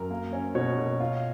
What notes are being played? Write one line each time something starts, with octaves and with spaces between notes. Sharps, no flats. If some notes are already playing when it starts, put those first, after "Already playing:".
Already playing: F#2 A#4
A#3
C#4
B2 C#5
B2
F4